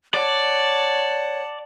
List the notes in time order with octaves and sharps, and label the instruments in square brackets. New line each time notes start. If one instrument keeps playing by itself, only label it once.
[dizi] C#5 [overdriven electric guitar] D5 [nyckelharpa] F#5 A5